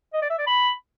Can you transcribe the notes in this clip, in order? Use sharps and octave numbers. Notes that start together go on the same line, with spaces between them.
D#5
D5
E5
D5
B5